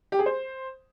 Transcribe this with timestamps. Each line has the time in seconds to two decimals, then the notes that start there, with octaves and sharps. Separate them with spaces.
0.12 G4
0.19 G#4
0.26 C5